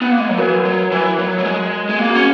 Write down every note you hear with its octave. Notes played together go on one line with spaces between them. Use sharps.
B3
A#3
G#3
F#3 B4
E3 F#4 A#4
F#3
E3 F#4 A#4
F#3
F#3
G#3
G#3
A#3 G#4
F#4
C#4